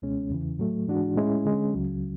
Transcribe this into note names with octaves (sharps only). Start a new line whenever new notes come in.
C#2 B2 G#3 C#4
E2 C#3 E3
A2 F#3 A3
G#2 E3 G#3 D4 F#4
A2 G#3 C#4 E4
D3 G#3 C#4
C#2 C#3 F#3